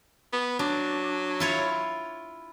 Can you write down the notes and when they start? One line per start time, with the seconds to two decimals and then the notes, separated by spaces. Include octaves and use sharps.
0.33 B3
0.59 F#3 D4
1.40 E4 F4 C#5